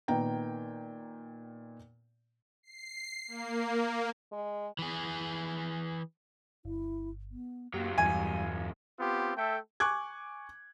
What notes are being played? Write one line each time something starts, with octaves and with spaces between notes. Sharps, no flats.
A#2 D#3 B3 G5 A#5
C7
A#3
G#3
E3 G#4
G1 E4
B3
C#2 F#2 F#3 A#3 G4
E2 G2 E3 G3 G#5
B3 C4 F4 G4
A3 A4 E5 G5
G#5 C#6 D6 F#6 G#6